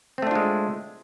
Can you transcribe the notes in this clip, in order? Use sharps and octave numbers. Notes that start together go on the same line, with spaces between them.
G#3 A3 C4 D4 F4